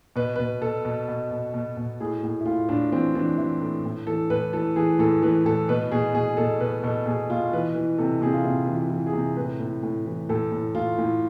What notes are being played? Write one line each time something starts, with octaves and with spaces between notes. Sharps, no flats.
B2 B4
B4
B2
B2 A4
B2
B2
B2
B2
B2
A2 G#4
A2
E4
A2 F4
A2 D4
E3 C4
E3 D4
E3 E4
A2
A2
E3 A4
A2 B4
E3 A4
E3 G#4
A2 A4
E3 B4
A2 A4
B2 B4
B2 G#4
B2 G#4
B2 A4
B2 B4
B2 A4
B2 G#4
B2 F4
E3 B4
E3
C3 A4
C3 G#4
F4
C3 E4
E3
F4
E3
G#4
C3
A2 B4
A2
A2
E3
A2 A4
A2
A2 F4
A2